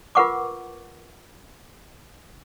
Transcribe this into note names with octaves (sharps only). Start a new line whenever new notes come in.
F4 A#4 B4 F#5 C#6 D6